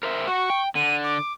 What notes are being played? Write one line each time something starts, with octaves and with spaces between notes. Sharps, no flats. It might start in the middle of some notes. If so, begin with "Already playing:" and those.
A#4 C5 E5
F#4 C#6
G5
D3 D#7
D6